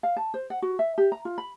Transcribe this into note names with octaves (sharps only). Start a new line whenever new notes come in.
F5
A5
C5
F#5
F#4
E5
G4
A#5
F4
B5